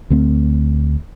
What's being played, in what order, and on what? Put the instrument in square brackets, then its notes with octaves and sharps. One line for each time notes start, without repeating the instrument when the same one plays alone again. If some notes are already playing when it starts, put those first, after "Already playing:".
[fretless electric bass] D2 A3 C4